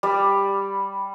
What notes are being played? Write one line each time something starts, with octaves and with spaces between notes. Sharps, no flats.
G3 D5